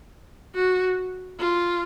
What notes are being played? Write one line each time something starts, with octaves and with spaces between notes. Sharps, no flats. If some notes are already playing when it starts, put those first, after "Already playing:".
F#4
F4